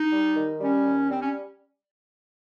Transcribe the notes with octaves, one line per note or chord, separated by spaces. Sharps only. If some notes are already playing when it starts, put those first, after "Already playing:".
Already playing: D#4
G3
D#3
G3 C#4
D#2
G3 C4
C#4